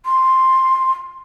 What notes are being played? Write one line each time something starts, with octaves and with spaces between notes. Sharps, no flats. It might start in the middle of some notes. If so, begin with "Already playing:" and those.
C6